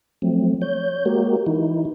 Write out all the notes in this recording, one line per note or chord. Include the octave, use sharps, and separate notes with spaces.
F3 F#3 A3 C4
C#5 G6
G#3 A#3 F#4 G4 A#4
E3 D#4 E4